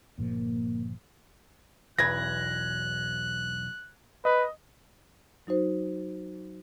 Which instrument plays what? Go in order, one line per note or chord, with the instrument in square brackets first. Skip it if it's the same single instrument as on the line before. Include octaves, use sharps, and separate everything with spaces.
[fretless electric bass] G1 A#2 F3 [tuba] A#3
[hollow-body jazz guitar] B1 E2 B4 [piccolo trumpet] F#6 [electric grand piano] G#6 A#6
[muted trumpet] B4 [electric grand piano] D#5
[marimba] F#3 D#4 F#4 C5